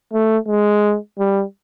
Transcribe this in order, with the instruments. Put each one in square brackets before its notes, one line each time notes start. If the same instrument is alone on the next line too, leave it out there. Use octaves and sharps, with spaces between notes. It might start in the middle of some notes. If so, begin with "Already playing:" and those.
[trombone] A3
G#3
G3